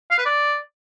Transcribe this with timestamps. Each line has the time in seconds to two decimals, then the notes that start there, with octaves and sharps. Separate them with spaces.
0.11 F5
0.18 B4
0.26 D5